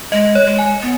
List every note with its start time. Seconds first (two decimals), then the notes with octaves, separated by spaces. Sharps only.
0.12 G#3 D#5
0.35 C#5
0.47 G#3
0.59 G#5
0.82 B3